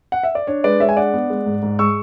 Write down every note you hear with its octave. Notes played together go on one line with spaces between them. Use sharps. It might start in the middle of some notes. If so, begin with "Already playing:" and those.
F#5
E5
D5
D4 C#5
G#3 B4 D5
G#3 C#5 E5
G#5
D4 D5 F#5
B3
G#3
G#2
G#2
G#3 C#6 E6